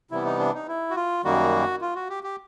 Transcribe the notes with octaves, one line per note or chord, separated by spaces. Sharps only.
C3 E3 G3 B3 E4
D#4
D4
D#4
E4
F#4
F4
F#2 D#3 G3 A#3 F#4
F4
F#4
G4
G4